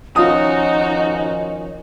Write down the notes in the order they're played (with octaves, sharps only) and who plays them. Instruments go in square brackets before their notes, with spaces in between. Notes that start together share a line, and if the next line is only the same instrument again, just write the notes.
[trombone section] D#3 F3 C#4 [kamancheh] D#4 F#4 [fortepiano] F4 D#6 [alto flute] D#5